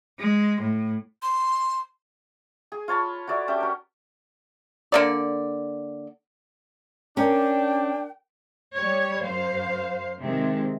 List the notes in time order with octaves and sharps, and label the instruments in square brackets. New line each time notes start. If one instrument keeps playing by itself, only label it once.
[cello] G#3
A2
[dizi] C6
[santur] G#4
F4 C#5 A5 B5
F#4 A4 D5 E5
C#4 D4 G4 E5
F#4 A#4
[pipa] D3 A#3 D5
[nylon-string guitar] C#4 [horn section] D4 [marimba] A#4 A#5 [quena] G5
[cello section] G3 C#5
F#2 C5 F5
C3 D#3 G#3 C4